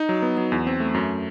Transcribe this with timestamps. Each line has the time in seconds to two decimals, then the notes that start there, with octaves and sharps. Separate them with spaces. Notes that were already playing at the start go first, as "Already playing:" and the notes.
Already playing: D#4
0.09 F#3
0.22 B3
0.37 F#3
0.52 E2
0.67 C4
0.80 A3
0.94 F#2